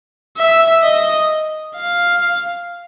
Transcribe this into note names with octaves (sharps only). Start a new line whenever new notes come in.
E5
D#5
F5